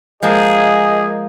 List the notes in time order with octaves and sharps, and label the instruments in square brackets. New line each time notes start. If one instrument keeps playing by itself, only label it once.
[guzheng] F3 G#3 A#3 [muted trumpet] G#4 [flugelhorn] D#5